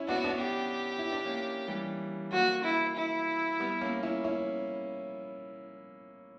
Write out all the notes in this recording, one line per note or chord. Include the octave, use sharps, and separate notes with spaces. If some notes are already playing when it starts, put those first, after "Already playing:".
Already playing: C#4 E4
B3 D4 F#4
B3 D4
G4
E4
D4
A#3 C#4
E3 G3
F#3 A#3 F#4
E4
E4
G3 B3
A#3 C#4
C#4 E4
C#4 E4